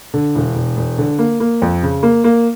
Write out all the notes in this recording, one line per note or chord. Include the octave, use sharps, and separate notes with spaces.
D3
E1
E1
E1
D3
A#3
A#3
F2
C#3
A#3
A#3